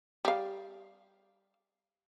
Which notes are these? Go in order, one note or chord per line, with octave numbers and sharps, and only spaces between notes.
G3 F5